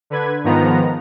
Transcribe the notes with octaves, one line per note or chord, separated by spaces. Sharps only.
D3 B4 G#6
G#2 D#3 F3 B3 A#5